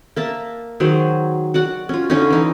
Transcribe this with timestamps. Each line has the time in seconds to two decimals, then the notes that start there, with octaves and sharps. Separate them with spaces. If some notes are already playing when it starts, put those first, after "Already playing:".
0.16 A#3 E5 A5
0.80 D#3 F#3 G#4 C5
1.54 F#4 D5 F#5
1.89 C#4 F4
2.10 D3 C#4 D#4
2.30 E3 D#4